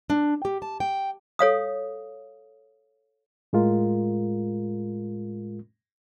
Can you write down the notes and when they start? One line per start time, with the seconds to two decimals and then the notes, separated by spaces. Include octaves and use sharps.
0.10 D4
0.45 G4
0.62 A5
0.80 G5
1.39 A4 C#5 F5 D#6
3.53 A2 G#3 F4 A#4